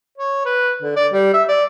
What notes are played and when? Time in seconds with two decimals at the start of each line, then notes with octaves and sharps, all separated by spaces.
0.18 C#5
0.45 B4
0.82 D3
0.96 D5
1.13 G3
1.34 E5
1.48 D5